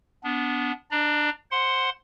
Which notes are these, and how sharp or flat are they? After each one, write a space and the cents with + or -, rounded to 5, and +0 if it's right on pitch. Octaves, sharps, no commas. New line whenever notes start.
B3 +0 D4 -25
D4 +10 D5 +40 A#5 +0
C5 +15 F#5 +0 C6 +0